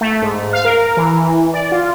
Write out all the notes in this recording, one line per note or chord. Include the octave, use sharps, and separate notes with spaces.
A3
G#2
F5
A#4
E3
D5
F4